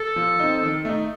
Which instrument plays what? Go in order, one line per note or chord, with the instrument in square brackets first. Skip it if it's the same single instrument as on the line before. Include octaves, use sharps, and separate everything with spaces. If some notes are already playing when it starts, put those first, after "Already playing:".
Already playing: [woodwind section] A4
[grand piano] F3
C4 D#4
D#3
A3 D#4